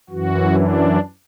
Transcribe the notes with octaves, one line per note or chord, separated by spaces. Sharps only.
F#2 E3 F#4
D4